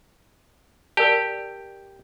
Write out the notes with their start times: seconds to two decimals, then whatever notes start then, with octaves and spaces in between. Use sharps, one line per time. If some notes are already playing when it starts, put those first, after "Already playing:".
0.97 G4 A#4 D5 A5